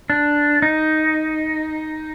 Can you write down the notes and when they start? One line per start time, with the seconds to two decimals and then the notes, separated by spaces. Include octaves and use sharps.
0.10 D4
0.62 D#4